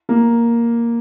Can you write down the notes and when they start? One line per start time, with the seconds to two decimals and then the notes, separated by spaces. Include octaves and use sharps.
0.09 A#3